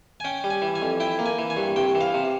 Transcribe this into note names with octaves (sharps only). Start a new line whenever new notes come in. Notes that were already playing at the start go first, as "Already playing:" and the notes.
G#5
C#4 G5
G3
G#5
E3
G#5
F2
E4 G5
A#3
G#5
E3
G#5
G2
C2 G5
E3
F5
C3